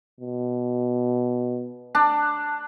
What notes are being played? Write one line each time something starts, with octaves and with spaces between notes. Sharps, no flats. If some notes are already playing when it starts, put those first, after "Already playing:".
B2
D4